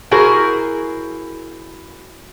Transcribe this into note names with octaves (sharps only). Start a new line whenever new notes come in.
E4 F#4 G#4 A#4 C5